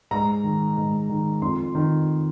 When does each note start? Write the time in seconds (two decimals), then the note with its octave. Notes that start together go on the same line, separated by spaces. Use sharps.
0.11 G#2 A#5
0.44 D#3
0.77 G#2
1.09 D#3
1.42 F2 C6
1.75 D#3